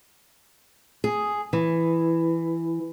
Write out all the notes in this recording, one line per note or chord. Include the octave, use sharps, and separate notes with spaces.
G#4
E3